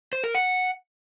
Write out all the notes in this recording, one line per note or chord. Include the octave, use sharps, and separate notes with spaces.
C5
A#4
F#5